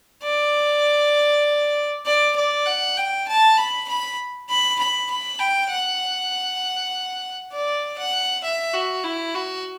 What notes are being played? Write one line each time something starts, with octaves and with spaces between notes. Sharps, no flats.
D5
D5
D5
F#5
G5
A5
B5
B5
B5
B5
B5
G5
F#5
D5
F#5
E5
F#4
E4
F#4